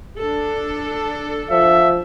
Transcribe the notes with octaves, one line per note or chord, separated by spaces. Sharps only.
D4 A4
F3 E5